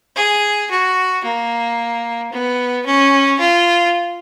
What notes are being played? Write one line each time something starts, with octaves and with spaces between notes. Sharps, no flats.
G#4
F#4
A#3
B3
C#4
F4